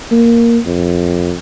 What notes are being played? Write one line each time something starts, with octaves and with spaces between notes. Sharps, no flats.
A#3
F2